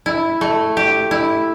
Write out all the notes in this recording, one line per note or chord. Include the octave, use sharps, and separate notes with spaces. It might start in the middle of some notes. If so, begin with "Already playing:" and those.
E4
A3
G4
E4